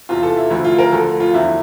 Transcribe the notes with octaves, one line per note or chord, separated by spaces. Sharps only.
E2 C3 E3 F4
A4
E4
D2 D3 F3 E4
F4
A#4
D2 D3 F3 A4
F4
E2 D3 F3 E4